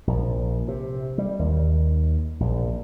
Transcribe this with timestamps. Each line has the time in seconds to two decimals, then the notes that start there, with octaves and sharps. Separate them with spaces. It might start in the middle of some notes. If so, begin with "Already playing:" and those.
0.07 A#1
0.68 C3
1.18 G3
1.39 D#2
2.40 A#1